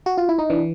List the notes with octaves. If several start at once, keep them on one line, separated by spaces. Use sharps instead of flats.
F#4
F4
E4
D#4
E3 D4